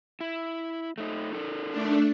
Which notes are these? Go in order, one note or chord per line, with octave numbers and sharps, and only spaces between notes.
E4
A3 D#4
D#4 A4 A#4
A3 D4